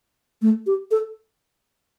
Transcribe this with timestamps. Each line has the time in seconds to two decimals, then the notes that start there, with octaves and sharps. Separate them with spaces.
0.42 A3
0.67 G4
0.91 A4